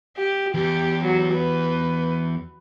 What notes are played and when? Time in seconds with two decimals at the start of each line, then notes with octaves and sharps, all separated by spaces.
0.17 G4
0.54 E2 G4
1.03 F#3
1.35 B4